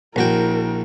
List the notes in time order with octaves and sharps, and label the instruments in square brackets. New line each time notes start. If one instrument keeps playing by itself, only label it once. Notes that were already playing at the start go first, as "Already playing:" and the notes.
[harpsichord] A#1 F#4 G5 [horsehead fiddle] E4 A#4